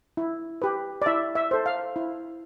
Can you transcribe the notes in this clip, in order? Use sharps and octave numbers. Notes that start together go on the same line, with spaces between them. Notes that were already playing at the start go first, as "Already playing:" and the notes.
E4
G4 B4
D5
E4 E5
E5
A4 C5
F5
E4